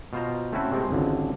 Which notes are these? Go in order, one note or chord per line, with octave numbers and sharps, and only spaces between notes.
B2 F4 C5 A#5
A3 C4 C#4 E4 F#4 A4
A2 C3 G#3 A3 C4
G#1 C#2 D3